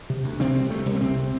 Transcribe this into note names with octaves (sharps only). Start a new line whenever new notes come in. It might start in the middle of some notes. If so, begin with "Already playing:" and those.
C3
D2
C3 C4
C2 C4
C3 A3
C2
A3
C3 C4